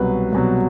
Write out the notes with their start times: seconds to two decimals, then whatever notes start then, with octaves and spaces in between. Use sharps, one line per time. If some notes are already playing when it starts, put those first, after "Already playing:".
Already playing: C2 B2 F#3 B4
0.32 C2 B2 F#3